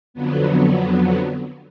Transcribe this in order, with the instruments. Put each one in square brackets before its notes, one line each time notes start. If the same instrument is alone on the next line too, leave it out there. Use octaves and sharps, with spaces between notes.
[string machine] F2 D3 F#3 B3